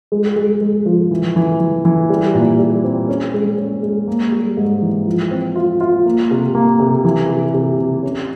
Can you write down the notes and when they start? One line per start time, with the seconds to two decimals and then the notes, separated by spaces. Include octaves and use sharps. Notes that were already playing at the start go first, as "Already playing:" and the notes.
0.12 G#3
0.36 G#3
0.61 G#3
0.86 F3
1.11 E3
1.36 E3
1.60 E3
1.85 E3
2.10 G3
2.35 A#2
2.59 G3
2.84 C4
3.09 C#4
3.34 G#3
3.58 C#4
3.83 G#3
4.08 A#3
4.32 G3
4.57 G#2
4.82 E3
5.07 F3
5.31 C4
5.56 F4
5.81 F4
6.06 A#3
6.31 C3
6.55 A#3
6.80 C3
7.04 E3
7.29 C3
7.54 C3
7.79 C3
8.03 C#4